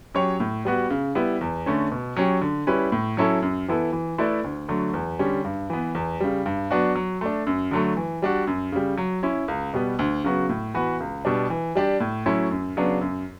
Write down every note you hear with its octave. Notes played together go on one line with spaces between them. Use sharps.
F#3 C#4 G4 C#5
A2
G3 B3 F#4
C#3
G3 B3 E4
E2
D3 A3 C#4
B2
F#3 C#4 G4
D3
G3 C#4 E4 B4
A2
F#3 C#4 E4 A4
F#2
E3 B3 E4 A4
E3
A3 E4 B4 D5
D2
D3 F#3 A3
E2
D3 G3 C#4
G2
E3 B3
E2
C#3 G3
G2
F#3 B3 D4 F#4
F#3
A3 D4
F#2
D3 F#3 A3
E3
G3 D4 F#4
F#2
C#3 G3
F#3
C#4 E4
C#2
B2 G3 B3
D2
C#3 F#3 B3 F#4
A2
E3 B3 F#4 B4
C#2
B2 G3 D4
E3
G3 D4 G4 D5
A2
F#3 A3 C#4 E4
F#2
C#3 F#3 B3 D4
F#2